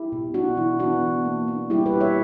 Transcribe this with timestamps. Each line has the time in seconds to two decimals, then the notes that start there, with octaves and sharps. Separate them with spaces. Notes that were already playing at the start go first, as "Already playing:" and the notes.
Already playing: E4 G4
0.12 B2
0.34 D4 F#4
0.57 E3 E4
0.79 B3 D4 F#4
1.03 E3
1.25 A#3
1.48 D4
1.70 G3 E4 G4
1.86 G4 B4
1.94 B2
2.00 C#5 E5